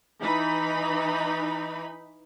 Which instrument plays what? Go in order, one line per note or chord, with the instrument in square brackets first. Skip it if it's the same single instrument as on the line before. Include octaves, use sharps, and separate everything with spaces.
[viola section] E3 D#4 B5